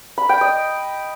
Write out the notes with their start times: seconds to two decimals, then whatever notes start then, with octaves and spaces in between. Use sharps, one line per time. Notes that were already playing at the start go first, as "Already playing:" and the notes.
0.18 B5
0.29 G5
0.41 D#5